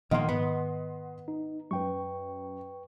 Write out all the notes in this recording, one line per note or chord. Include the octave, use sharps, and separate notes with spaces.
A#2 D#3 F3 A#3 B3 D#5 F#5 C6
G#2 D#3 B3
D#4
F#2 B4 G5 C#6